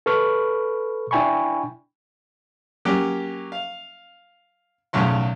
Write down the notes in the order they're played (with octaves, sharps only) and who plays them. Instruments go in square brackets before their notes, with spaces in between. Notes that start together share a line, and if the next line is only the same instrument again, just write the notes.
[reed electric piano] A4 B4 B5 C#6 F6
D4 E4 G5 G#5 B5 C#6
[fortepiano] F#3 A#3 C#4 G4
F5
B1 E2 A2 C#3 F#3 C6